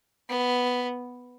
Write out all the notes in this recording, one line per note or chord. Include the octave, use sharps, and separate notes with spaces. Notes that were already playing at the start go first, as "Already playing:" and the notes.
B3